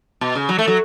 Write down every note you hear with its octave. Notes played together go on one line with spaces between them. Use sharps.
B2
C#3
F#3
A3
F#3